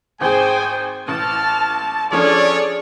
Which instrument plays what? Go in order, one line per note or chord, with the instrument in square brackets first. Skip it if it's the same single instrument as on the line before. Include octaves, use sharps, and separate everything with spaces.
[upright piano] G#1 G#4 [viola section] C5 G5 [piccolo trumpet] G#5
[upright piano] A1 [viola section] A5 [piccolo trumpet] F6
[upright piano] F3 C#4 D4 [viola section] G#4 A4 D5 [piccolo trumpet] C#5